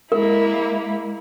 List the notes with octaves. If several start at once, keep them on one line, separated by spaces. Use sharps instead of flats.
G#3 A#3 E4 A#4